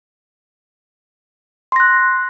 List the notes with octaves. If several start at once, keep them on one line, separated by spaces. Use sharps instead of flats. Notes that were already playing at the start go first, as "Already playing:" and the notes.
C6 F#6 A#6